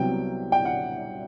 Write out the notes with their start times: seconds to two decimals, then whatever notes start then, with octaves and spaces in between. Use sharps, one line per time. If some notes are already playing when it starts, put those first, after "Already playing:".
Already playing: C2 C3 F#3 B3 G5
0.52 G5
0.65 F#5